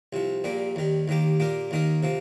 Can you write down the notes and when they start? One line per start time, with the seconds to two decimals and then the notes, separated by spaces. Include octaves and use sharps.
0.13 C2 C3 F3
0.44 A#1 A#2 G3 A#3
0.76 D#2 D#3 G3
1.08 D#2 D#3 A#3 G4
1.40 A#2 A#3 G4 A#4
1.71 D#2 D#3 A#3 D#4 A#4
2.03 C3 F3 A#3